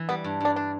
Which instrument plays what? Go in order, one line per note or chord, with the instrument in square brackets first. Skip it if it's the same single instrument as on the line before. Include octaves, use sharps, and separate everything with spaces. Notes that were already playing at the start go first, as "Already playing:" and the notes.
Already playing: [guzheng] E3
[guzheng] G3 [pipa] B3
[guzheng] G2
[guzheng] G2 [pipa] D4
[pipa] D4